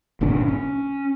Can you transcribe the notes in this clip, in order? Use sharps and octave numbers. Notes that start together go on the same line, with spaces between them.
G1 A#2 C#3 D4
C#4